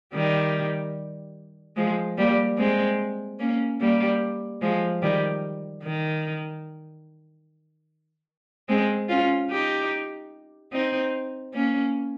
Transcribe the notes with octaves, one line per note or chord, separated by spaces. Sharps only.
D#3 G3
F3 G#3
G3 A#3
G#3 C4
A#3 C#4
G3 A#3
F3 G#3
D#3 G3
D#3
G#3 C4
C#4 F4
D#4 G4
C4 D#4
A#3 C#4